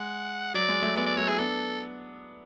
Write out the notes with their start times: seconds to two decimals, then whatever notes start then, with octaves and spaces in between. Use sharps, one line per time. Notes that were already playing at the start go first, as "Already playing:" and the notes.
Already playing: G#3 F#5
0.54 F#3 D5
0.69 G#3
0.82 F#3 A3
0.96 G#3 B3 D5
1.06 D5
1.17 F#3 A3 C#5
1.27 E4 G#4
1.38 B3 D4 A4